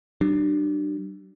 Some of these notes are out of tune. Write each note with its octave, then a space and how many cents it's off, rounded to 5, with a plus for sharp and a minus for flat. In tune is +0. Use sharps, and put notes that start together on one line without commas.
G3 -45 D4 +30